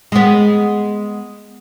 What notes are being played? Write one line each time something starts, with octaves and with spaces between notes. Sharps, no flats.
G#3 B3